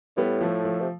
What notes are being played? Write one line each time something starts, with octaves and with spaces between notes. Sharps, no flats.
A2 G3 B3
F3 A3
F3 A3
C3